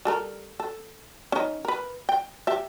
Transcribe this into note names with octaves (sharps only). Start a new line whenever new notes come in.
G3 A4 A#4
A4
C#4 D#4
A#4 B4
G5
G4 E5